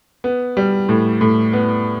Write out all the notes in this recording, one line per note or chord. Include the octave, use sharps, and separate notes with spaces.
B3
G3
A2
A2
B3